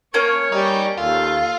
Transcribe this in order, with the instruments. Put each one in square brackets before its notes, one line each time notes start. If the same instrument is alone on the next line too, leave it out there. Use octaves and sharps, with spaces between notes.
[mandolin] A#3 C#4 [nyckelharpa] C#5 C#6
[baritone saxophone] G3 [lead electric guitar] D#4
[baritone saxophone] D#2 [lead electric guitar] F4 [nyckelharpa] A4 F5